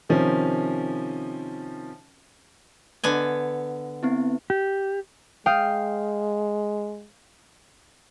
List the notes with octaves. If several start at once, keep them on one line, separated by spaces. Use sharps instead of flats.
C3 D#3 F3 C#4
D3 B3 G#5
B3 C4 E4
G4
G#3 F5 G5 D#6